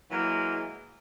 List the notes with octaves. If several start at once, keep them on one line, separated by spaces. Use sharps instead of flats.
E3 F#3 G#3 A#3